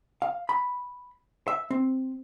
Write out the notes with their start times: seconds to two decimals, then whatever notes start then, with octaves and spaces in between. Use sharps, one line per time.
0.22 F5
0.49 B5
1.48 E5
1.71 C4